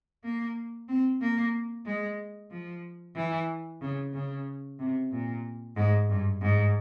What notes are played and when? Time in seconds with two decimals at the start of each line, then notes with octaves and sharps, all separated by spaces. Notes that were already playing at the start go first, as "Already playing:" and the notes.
0.24 A#3
0.89 C4
1.21 A#3
1.86 G#3
2.51 F3
3.16 E3
3.81 C#3
4.13 C#3
4.79 C3
5.12 A#2
5.76 G#2
6.09 G2
6.42 G#2